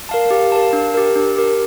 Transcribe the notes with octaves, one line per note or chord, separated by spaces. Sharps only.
A#4 F5 A5
G4
A#4 F5 A5
D4
G4 A#4
D4
G4 A#4